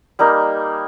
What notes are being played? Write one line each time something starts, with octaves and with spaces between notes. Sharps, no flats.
G3 A#3 D#4 A#4